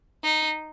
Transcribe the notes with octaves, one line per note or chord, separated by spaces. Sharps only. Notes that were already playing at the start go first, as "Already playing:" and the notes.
D#4